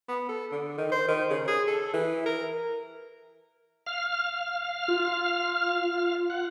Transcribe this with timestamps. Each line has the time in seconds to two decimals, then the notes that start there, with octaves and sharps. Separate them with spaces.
0.08 B3
0.29 A4
0.52 D3
0.78 D#3
0.91 C5
1.08 D#3
1.30 C#3
1.48 G#4
1.68 A4
1.93 E3
2.26 A#4
3.86 F5 F6
4.88 F4
6.30 F#5